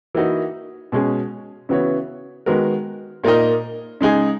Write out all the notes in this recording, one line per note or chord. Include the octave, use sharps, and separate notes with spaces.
E3 A#3 D#4 F#4 B4
B2 G#3 C#4 G#4
C#3 E3 B3 F#4 C#5
D#3 G#3 B3 F#4 A#4
A#2 A#3 D#4 A#4 D#5
C#3 G#3 D#4 G#4